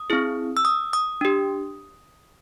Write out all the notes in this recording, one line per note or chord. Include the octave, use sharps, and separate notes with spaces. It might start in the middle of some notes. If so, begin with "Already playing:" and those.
Already playing: D#6
C4 E4 G#4
E6
D#6
D#6
D4 G4